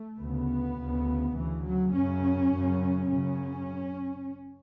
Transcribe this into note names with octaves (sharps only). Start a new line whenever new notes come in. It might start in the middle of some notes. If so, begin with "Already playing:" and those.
Already playing: A3
D2 C#3 B3
D2 C#3
D2 C#3 E3
F#3
F#2 C#3 C#4
F#2 C#3
F#2 C#3 C#4